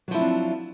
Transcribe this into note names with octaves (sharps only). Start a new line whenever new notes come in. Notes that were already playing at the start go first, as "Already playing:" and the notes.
F3 F#3 C4 D4 E4